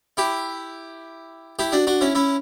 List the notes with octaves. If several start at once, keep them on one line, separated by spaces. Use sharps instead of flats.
E4 G4
E4 G4
D4 F#4
D4 F#4
C#4 E4
C#4 E4